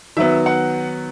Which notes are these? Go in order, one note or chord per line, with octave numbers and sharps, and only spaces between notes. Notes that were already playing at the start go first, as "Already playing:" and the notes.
D#3 F#3 B3 E5
F#5